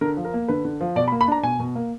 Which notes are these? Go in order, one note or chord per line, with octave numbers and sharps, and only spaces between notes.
D3 A#4
F3
A#4
A#3
D3 B4
D3
F3
B2 D5
B5
A#3
B5
D4 A#5
B2 G#5
B2
A#3